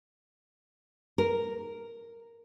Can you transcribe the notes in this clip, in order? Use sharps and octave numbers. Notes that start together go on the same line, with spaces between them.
A#4